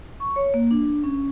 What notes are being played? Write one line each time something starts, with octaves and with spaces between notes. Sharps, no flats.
C#6
C#5
A#3
D4
C#4